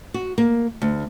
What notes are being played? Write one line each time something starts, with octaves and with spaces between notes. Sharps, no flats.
F#4
A#3
D2